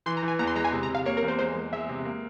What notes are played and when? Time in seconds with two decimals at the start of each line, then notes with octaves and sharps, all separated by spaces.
0.06 E3 C6
0.17 A#5
0.23 E3
0.28 G#5
0.39 E2 A#5
0.47 C6
0.56 G#3 A#5
0.64 G#5
0.73 C3
0.83 A#5
0.89 C3
0.95 F5
1.05 A#3 C#5
1.17 A#4
1.22 E2
1.28 C5
1.39 G#3 C5
1.56 G#3
1.73 G#3 E5
1.89 C3
2.05 A#3